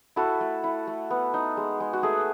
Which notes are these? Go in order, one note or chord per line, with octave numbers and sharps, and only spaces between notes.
E4 F#4 A4
A3
E4
A3
B3
D#4
G#3
G#3
F#4
A3 G#4